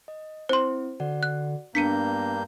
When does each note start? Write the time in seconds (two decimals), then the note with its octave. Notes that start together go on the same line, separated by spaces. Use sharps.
0.08 D#5
0.49 C4 E4 C5 C6
1.00 D3 F#4 D5 F#5
1.23 F#6
1.75 G2 A#3 B3 D4 G6 B6 C#7 D#7